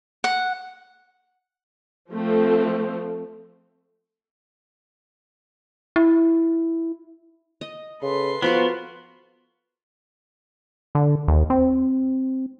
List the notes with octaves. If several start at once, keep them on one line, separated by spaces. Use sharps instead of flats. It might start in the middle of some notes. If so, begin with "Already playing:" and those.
F#5
F3 A3 C4
E4
D#5
C#3 A4 B4 C6
F3 B3 F4 F#4 A#4
D3
D#2
C4